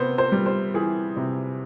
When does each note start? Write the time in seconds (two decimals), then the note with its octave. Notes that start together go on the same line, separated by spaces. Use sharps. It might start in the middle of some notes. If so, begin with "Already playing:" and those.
Already playing: C3 B3 C5
0.18 C5
0.32 G3
0.46 C5
0.74 E3 G#4
1.17 C3